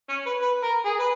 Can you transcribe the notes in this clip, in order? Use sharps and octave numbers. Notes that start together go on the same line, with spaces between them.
C#4
B4
B4
A#4
G#4
B4